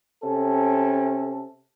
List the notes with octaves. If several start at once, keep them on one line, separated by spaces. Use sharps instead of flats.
C3 C#4 A4